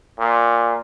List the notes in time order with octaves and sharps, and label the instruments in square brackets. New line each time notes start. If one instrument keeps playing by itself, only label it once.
[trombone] A#2